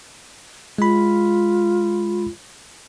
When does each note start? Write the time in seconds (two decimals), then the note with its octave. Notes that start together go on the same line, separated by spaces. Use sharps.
0.78 G#3 F4 B5